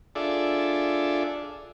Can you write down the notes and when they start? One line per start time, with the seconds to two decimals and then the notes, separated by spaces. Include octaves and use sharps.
0.15 D4 F4 G#4 A4 D5 E5